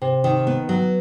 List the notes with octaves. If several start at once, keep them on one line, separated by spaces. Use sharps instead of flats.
C3
D#3
B3
F#3